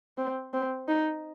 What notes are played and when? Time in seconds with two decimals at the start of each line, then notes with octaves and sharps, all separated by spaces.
0.18 C4
0.53 C4
0.88 D#4